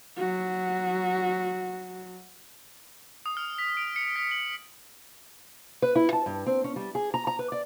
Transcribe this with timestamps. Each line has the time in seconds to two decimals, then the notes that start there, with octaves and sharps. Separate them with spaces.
0.16 F#3 F#4
3.26 D#6
3.37 F6
3.58 B6
3.77 D7
3.96 C#7
4.16 B6
4.31 F#7
5.82 B4
5.95 E4
6.13 A5
6.26 G2
6.46 C4
6.64 C#4
6.76 G3
6.95 G#4
7.14 A#5
7.27 A#5
7.39 B4
7.52 D5